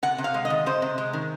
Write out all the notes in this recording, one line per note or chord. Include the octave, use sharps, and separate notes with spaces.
C3 F#5
C3
F5
G#3
D#5
D#3
C3 C5
C3
G#3
D#3